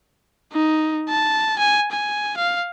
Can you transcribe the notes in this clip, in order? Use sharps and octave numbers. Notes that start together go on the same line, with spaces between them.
D#4
A5
G#5
G#5
F5